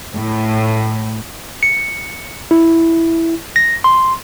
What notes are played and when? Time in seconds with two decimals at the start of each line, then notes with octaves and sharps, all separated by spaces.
0.15 A2
1.63 C#7
2.51 E4
3.56 A#6
3.84 C6